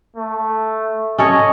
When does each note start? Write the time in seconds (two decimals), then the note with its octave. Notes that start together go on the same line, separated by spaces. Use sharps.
0.16 A3
1.18 C#4 A4 C#5 D#5